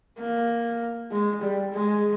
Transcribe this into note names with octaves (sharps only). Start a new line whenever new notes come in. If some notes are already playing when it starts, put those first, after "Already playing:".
A#3
G#3
G3
G#3